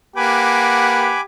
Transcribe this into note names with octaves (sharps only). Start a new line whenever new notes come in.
A#3 G4 B4 F#5 G#5 B5 D6